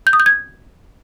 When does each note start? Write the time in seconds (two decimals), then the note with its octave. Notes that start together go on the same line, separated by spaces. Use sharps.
0.07 G6
0.13 D#6
0.20 G6
0.26 G#6